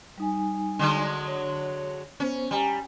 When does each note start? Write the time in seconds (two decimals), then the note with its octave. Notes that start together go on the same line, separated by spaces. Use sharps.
0.18 G3 D#4 G#5
0.79 D3 F#3 G#3
1.28 C#5
2.20 B3 C#4 C5
2.51 G3 G#5 A#5